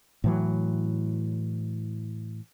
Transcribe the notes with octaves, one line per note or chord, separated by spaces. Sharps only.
A2 E3 F#3